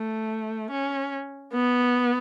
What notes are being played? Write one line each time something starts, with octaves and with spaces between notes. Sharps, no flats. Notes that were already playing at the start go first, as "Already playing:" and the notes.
Already playing: A3
C#4
B3